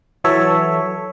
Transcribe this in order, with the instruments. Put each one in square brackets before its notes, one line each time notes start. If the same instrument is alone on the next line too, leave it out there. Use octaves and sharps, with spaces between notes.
[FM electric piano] E3 F#3 A4 C#5 E5